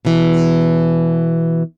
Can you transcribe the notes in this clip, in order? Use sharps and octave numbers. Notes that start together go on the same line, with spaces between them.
B2 E3